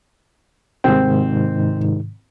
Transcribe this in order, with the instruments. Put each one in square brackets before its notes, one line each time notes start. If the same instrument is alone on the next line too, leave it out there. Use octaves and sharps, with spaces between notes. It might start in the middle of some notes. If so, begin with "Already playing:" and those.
[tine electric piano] G#2 C3 D#3 [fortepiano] C4